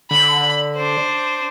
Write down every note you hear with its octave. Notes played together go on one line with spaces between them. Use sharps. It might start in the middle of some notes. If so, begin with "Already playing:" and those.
D3 B5
D4 C5